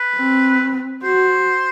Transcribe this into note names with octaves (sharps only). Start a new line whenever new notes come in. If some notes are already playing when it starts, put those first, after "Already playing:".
Already playing: B4
C4
F#4 C5